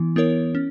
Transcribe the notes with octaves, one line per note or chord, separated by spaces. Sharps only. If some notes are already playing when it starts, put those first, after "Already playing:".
Already playing: E3 B3 E4
B3 E4 A#4 C#5
C#4